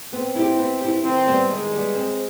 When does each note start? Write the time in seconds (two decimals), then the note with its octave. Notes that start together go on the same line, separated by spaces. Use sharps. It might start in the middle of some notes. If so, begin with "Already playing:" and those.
0.13 B3 C4
0.35 E4 G4
0.59 B3
0.81 E4 G4
1.04 D#3 C4
1.27 G3 B3
1.50 D#3 G#3
1.72 G3 B3
1.95 C4